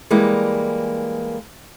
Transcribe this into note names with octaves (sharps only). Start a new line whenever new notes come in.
E3 G3 G#3 A#3